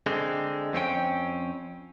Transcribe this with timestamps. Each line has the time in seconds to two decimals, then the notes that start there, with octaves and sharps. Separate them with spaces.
0.06 D3 G#3 C4
0.73 F2 C4 C#4 G5